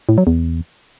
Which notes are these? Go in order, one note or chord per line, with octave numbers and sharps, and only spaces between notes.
A2
F#3
E2